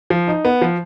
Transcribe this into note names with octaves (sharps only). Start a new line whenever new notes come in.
F3
D#4
B3
F3